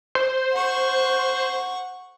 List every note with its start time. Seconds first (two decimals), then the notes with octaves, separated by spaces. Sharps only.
0.15 C5
0.51 F#5 C#6